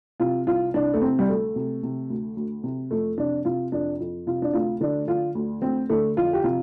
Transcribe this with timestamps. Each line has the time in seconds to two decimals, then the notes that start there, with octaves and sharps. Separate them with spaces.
0.20 C3 F4
0.47 C2 F4
0.74 C2 D4
0.94 A3
1.01 C3 C4
1.19 G3
1.28 D2 A3
1.56 C3
1.83 C3
2.10 D2
2.36 D2
2.64 C3
2.91 F2 A3
3.18 C3 D4
3.45 C3 F4
3.72 F2 D4
4.00 F2
4.27 C3 F4
4.42 D4
4.53 D2 F4
4.81 D3 D4
5.08 D3 F4
5.35 D2
5.62 D2 C4
5.90 D3 A3
6.17 F2 F4
6.33 G4
6.44 C3 F4